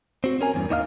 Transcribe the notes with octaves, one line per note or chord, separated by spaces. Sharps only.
C4 F#4
C#4 A#4 G#5
E2 G2
D#2 D#3 D#4 D5 F5